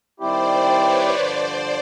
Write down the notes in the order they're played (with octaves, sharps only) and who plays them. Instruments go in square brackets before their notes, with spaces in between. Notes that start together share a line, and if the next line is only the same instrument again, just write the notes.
[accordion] D#3 G3 C4 E4 G4 [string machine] C5 D5
[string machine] B4 C#5
[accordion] G2 D3 F3 [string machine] C5 D5